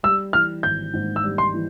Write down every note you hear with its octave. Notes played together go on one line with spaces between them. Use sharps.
G3 E6
E3 F6
G#1 G6
G#2
E6
G3
C6
E3